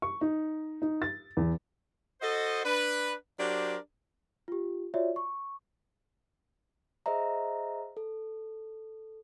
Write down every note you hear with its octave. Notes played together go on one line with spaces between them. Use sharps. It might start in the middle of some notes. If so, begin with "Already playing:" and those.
C#6
D#4
D#4
A6
E2
F#4 A4 C5 D#5
D4 B4
F#3 D4 G4 A#4 C5
F4 G4
F4 F#4 C#5 D5 E5
C#6
G#4 C5 D#5 E5 A#5
A4